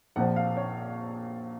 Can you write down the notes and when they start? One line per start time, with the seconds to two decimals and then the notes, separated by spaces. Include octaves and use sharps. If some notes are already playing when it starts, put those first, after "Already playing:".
0.16 A#1 A#2 F3 F#5
0.36 F5
0.57 C#5